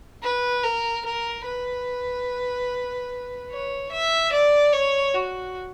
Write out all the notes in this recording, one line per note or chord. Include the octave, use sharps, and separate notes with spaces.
B4
A#4
A#4
B4
C#5
E5
D5
C#5
F#4